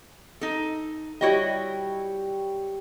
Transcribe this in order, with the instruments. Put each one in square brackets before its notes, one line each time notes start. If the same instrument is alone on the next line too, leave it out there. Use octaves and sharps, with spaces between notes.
[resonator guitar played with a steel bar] D#4 A4
[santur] G3 C#5 G5 [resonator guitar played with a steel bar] E4 F#4 D#5